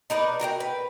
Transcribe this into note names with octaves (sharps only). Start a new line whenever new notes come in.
D#4 A#4 B4 D5
F#4 A#4 D#5 G5
B4